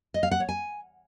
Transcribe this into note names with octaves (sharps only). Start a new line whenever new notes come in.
D#5
F5
F#5
C#5
G#5